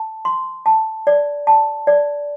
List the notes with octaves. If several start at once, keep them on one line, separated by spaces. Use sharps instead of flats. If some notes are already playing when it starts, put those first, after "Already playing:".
Already playing: A5
C6
A5
D5
A5
D5